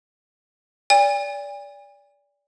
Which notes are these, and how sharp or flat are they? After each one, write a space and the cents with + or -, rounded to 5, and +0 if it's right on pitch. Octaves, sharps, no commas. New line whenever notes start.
D5 -25 G#5 -45